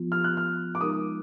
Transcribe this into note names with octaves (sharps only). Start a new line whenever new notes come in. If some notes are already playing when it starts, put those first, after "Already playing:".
Already playing: F3 B3 F4
F6
F#6
F6
D6
G#3 D#4 A#4 D#6